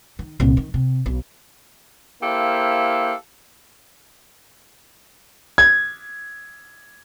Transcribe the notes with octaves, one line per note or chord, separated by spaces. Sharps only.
D#3
C2 A#2
D#3
C3
B1
A#3 E4 G4 A4 C5 F5
G#6